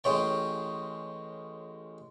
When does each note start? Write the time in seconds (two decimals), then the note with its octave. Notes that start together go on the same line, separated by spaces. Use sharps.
0.04 A1 G#3 C#5 G5